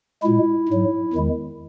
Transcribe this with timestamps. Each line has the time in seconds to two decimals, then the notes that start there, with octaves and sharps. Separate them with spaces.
0.23 A#2 G#3 E4
0.68 G#2 F#3
1.13 E2 D#3 G#3